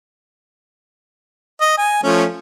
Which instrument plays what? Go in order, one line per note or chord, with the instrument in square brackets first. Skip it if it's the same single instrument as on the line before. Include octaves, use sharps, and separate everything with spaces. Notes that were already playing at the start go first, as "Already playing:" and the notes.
[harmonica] D#5
G#5
F3 A3 C#4